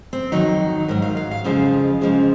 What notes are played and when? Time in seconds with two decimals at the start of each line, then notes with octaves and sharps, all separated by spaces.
0.13 C4
0.32 F2 D#3 F#3 D#4
0.88 G#2 F#3 A#4
1.02 F5
1.17 F5
1.31 F5
1.44 F2 C#3 F3 G#3
2.01 F2 C#3 F3 G#3